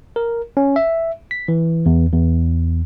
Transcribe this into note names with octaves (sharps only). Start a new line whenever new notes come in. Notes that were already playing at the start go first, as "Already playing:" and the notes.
A#4
C#4
E5
B6
E3
E2
E2